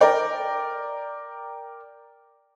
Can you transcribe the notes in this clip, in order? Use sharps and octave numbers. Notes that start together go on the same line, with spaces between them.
A#4 D5 G5